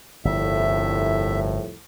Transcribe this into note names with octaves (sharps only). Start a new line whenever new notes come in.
G1 C2 F2 A2 E5